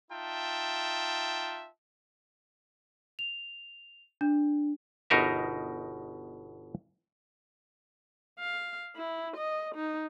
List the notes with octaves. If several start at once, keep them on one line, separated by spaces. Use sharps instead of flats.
D#4 F4 E5 G5 A5
F7
D4
G1 B2 D#4 A#4 E5
F5
E4
D#5
D#4